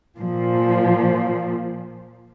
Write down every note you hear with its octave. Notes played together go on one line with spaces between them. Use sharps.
A#2 F3